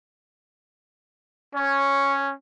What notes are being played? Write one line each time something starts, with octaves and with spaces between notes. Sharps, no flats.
C#4 C#5